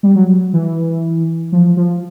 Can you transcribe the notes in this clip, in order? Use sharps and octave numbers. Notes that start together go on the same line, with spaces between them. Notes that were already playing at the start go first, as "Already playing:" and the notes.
G3
F#3
E3
F3
F3